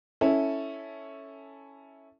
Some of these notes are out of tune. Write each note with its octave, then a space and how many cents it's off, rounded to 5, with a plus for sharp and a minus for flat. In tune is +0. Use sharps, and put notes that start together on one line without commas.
C#4 +0 E4 -10 A4 +0